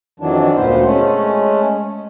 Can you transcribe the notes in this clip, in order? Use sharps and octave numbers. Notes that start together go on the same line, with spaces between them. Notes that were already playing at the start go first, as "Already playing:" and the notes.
F2 D#3 E3 F#3 D4
D2 A#2 B3 C5
G#3 A3 C#4